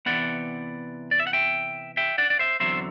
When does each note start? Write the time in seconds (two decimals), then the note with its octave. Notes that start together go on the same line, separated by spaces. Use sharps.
0.06 C3 E3 B3 D5 F#5
1.11 D5
1.20 E5
1.27 F#5
1.33 E5 G5
1.97 E5 G5
2.18 D5 F#5
2.30 D5
2.39 C5 E5
2.60 E2 D3 F#3 C4 C5 E5